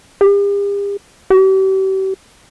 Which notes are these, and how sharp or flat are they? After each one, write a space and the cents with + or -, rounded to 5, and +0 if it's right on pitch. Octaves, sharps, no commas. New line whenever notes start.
G4 +45
G4 -40